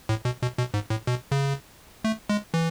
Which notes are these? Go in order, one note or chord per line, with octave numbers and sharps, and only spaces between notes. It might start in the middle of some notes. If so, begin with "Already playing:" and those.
A2
B2
B2
B2
G#2
A2
B2
C#3
A3
G#3
E3